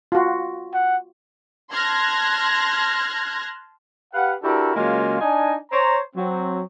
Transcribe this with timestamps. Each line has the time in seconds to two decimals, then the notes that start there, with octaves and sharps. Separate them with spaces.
0.12 F4 F#4
0.74 F#5
1.72 A5 C6 F6 F#6 G#6 A#6
4.14 G4 B4 F5 F#5
4.43 D4 E4 F#4 G4 A4 A#4
4.76 C#3 F#3 G#3 A#3 C#4 F4
5.21 D4 D#4 D#5 G#5
5.71 C5 C#5 A#5
6.16 F#3 C4